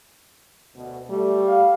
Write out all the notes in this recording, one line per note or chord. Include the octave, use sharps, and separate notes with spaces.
D2 B2
G3 A3
F5